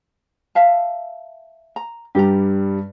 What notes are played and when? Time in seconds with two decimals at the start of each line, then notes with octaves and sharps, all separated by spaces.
0.55 E5 F5 A5
1.76 A#5
2.15 G2 G3 G4 A#5